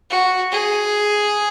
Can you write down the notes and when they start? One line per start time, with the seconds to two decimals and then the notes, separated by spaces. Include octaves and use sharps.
0.10 F#4
0.52 G#4